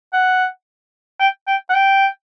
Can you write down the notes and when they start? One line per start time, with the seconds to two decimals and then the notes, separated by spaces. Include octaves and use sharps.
0.13 F#5
1.20 G5
1.47 G5
1.69 F#5
1.74 G5